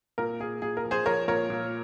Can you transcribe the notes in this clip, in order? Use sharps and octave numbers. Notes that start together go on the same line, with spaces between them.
A#2 A#4
A#2 G#4
A#2 G#4
A#4
F3
G#4 C5
F3 A#4 C#5
A#2 A#4 C#5
A#2